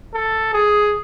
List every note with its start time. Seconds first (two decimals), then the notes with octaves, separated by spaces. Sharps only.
0.14 A4
0.53 G#4